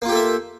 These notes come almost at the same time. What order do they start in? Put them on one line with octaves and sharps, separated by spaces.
A#3 F4 G4 A4 E5